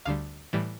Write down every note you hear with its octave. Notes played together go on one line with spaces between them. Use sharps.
D2 D3 G3 F5
A2 E3 G3